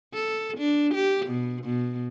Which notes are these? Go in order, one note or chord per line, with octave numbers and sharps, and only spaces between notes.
A4
D4
G4
B2
B2